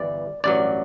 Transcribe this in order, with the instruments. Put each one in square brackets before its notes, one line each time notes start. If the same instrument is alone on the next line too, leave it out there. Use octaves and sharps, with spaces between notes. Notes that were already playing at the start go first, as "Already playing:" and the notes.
Already playing: [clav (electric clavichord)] G1 G2 E3 D5
A1 G2 F#3 D5